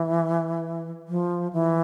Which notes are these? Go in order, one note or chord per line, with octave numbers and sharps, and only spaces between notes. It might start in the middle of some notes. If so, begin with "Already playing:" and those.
Already playing: E3
F3
E3